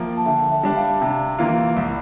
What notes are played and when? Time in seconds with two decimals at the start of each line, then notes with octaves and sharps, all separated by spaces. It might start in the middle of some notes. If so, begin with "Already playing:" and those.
Already playing: F3 A#3 E5 G5
0.17 A5
0.26 D3 E5 G5
0.51 E5 G5
0.63 G3 D4
0.76 F5 A5
1.01 C3 E5 G5
1.39 E3 A#3 F4
1.76 C2